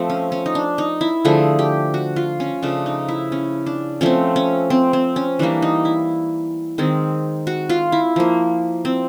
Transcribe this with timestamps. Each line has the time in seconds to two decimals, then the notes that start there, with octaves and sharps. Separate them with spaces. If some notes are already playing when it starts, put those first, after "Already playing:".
Already playing: F3 A3 C4
0.10 C#4
0.32 C#4
0.46 D#4
0.55 D4
0.78 D#4
1.01 E4
1.25 D3 F3 A3 G#4
1.59 G4
1.94 F#4
2.16 F4
2.40 C#4
2.62 C#3 F3 A3 D4
2.86 D#4
3.08 E4
3.32 C#4
3.66 D4
4.01 F3 A3 C4 C#4
4.36 C#4
4.70 C4
4.93 C4
5.16 C#4
5.39 E3 G3 A#3 D4
5.62 D#4
5.85 E4
6.78 D#3 G#3 C4
7.47 F#4
7.69 F4
7.92 E4
8.16 F3 A#3
8.85 C4